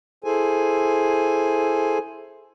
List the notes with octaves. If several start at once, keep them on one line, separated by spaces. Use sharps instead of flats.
E4 G#4 A4 C5 G#5